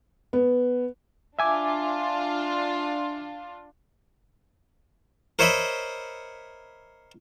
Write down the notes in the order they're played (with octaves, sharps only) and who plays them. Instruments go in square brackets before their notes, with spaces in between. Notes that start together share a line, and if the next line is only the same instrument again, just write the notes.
[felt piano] B3
[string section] D4 F4 [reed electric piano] E5 G#5 D6
[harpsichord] A#4 C5 C#5 D#5 E5 B5